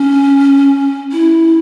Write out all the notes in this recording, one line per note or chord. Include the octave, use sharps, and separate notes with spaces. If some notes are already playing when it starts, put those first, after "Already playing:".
Already playing: C#4
E4